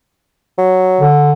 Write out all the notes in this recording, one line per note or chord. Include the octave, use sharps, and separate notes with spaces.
F#3
D3